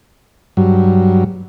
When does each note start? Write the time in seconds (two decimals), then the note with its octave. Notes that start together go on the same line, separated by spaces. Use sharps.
0.57 G2 F#3